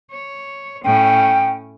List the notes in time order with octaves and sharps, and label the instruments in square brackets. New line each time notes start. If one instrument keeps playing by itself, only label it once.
[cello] C#5
[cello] A2 C#4 [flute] G5